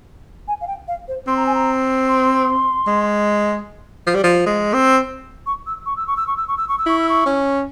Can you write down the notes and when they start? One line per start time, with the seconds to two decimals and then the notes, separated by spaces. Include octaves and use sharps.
0.48 G#5
0.61 F5
0.67 G5
0.88 F5
1.08 C5
1.27 C4 C6
1.37 A#5
1.46 G#5
1.55 A#5
2.08 C6
2.87 G#3
4.07 F3
4.15 G3
4.24 F3
4.46 G#3
4.73 C4
5.46 C#6
5.67 E6
5.86 C#6
5.97 E6
6.07 C#6
6.17 E6
6.27 C#6
6.37 E6
6.48 C#6
6.57 E6
6.68 C#6
6.78 E6
6.86 E4 C#6
6.99 E6
7.09 C#6
7.26 C#4